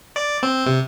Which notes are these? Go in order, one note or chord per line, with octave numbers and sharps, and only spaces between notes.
D5
C4
C3